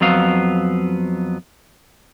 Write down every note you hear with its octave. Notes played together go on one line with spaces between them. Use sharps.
F2 F#3 B3 F5